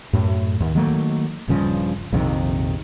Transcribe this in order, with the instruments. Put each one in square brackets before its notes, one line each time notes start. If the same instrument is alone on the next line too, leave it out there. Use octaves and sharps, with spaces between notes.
[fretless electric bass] F#2 A2
D#2
D#3 F#3 A3 A#3
D#1 G2 C#3 F3
A#1 F2 C3 D#3